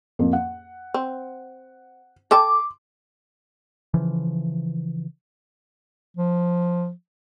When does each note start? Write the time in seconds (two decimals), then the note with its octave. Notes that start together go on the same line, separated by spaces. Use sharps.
0.19 F2 A#3
0.33 F#5
0.94 C4
2.31 A4 G5 A5 C6 D6
3.94 C#3 E3 F3
6.17 F3